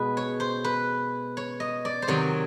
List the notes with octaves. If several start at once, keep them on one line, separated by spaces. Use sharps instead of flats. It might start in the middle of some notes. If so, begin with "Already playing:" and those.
Already playing: B2 G#3 F#4 G#4 B4
C#5
C5
B4
C#5
D#5
D5
C5
C3 D#3 F#3 C#5